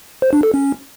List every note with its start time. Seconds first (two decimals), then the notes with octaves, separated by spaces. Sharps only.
0.22 C5
0.33 D4
0.43 A4
0.54 C#4